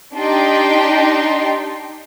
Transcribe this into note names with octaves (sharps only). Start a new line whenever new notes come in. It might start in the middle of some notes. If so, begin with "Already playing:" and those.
D4 D#4 G4 D#5 G5 C6